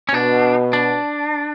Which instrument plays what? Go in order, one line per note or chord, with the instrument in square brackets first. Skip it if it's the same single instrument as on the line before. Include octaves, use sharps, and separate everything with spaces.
[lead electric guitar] C#4
[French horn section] B2 [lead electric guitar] D4
[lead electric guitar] D4